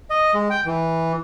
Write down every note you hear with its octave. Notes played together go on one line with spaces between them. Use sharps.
D#5
G#3
G5
E3